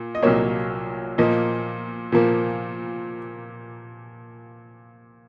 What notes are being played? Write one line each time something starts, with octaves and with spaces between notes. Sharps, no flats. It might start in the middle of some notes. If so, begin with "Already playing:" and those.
Already playing: A#2
D#5
C2 A#2 F#3 A#3 C#5
A#2 F3 A#3 D#5
A#2 F3 A#3